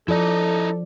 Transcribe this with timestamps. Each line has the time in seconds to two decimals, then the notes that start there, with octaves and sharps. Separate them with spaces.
0.08 F3 E4 A4 D5 D#5 A#5